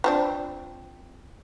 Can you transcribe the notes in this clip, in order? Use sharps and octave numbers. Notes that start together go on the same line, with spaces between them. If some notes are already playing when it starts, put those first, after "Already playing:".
F3 C4 D4